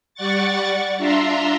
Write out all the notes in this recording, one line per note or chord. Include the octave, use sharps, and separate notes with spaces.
G3 D5 F#5 C#6 A6
D4 F4 E5 A#5 C6